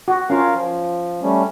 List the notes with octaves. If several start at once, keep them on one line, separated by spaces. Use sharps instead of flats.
F#4
C#4 F4 A#4 F5
F3
G3 A3 C#4